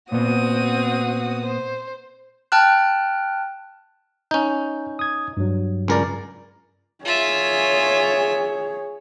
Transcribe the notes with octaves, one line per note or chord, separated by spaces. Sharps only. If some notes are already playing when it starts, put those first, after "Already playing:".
A#2 B3 C4 F#4 D#6
C5
G5 A5 F6 F#6
C#4 D#4 G6
D#6 G#6
G2 F#3
C#2 A#4 D5
F4 G#4 C#5 E5